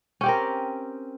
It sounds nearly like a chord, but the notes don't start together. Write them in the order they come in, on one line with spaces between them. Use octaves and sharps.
C#4 G4 C4 A#4